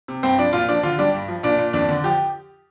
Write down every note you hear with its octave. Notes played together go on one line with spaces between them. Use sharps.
C3
G2 C4
F3 D4
A#2 F4
F3 D4
D3 F4
G3 D4
G2
F3
A#2 D4
A#2
F2 D4
D3
F3 G4